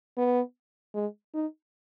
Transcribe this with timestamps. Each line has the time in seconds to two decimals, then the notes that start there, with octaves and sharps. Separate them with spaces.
0.18 B3
0.95 G#3
1.34 D#4